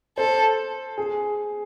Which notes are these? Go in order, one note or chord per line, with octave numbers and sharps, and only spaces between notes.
A4 C5
G#4